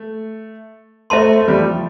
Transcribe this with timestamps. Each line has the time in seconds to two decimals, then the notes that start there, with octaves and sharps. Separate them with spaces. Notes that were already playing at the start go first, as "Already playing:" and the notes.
Already playing: A3
1.10 A3 C5 E5 A5 C6
1.38 A3
1.48 G3
1.58 F3